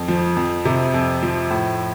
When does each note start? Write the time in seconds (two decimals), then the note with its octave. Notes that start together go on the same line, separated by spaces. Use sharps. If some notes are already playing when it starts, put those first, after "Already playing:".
Already playing: F2
0.08 F3
0.36 F2
0.65 C3
0.94 F2
1.23 F3
1.51 A2